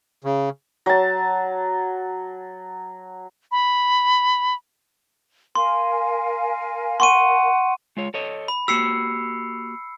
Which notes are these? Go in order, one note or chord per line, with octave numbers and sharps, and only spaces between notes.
C#3
F#3 A5
B5
A#4 F5 G#5 C6
F#5 C6 C#6 D#7
G#3 F4 C#5
A4 C#5 D#5
B5
A#3 F#4 G4 E6 C7 C#7